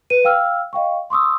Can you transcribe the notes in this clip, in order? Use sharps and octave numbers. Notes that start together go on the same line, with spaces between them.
B4 D#7
F5 G5 E6 F6
D#5 F5 G5 C#6
C6 C#6 D#6 E6